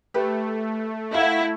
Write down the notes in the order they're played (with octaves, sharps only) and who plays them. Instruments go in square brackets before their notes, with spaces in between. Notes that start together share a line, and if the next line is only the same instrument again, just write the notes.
[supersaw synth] A3 [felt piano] G4 B4
[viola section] E4 [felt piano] F5 F#5